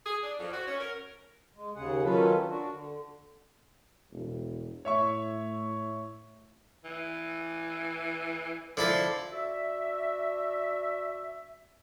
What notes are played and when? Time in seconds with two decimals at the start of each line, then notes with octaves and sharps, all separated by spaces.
0.06 G#4
0.23 D4
0.40 F2
0.52 F#4
0.68 C#4
0.80 A#4
1.56 G#3
1.76 D#2 C#3 G#4 F#5
2.04 D#3 F#3 C#4 F4 A4 B4
2.49 D4 F#4
2.72 D3
4.11 E1
4.85 A2 C#5 E5 C#6
6.85 E3
8.77 D3 F3 E4 A4
9.32 D4 F#4 E5